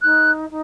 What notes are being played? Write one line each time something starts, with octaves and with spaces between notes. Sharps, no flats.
D#4 F#6
D#4